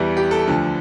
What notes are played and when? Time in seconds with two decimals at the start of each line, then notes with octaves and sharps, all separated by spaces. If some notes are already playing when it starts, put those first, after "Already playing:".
Already playing: E2 E3 G3
0.17 G4
0.31 A4
0.46 D2 D3 F3